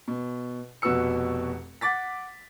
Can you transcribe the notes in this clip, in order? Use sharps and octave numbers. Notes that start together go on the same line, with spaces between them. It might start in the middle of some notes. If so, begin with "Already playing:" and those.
B2
F1 B2 F#4 B4 E6 C#7
F#5 D6 A6 B6